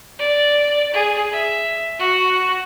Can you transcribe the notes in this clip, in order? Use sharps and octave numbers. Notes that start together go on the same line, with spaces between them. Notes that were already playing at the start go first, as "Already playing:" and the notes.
D5
G#4
E5
F#4